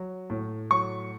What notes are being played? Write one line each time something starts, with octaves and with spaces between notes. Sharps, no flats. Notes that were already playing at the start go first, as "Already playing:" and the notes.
Already playing: F#3
A2
F#3 C#6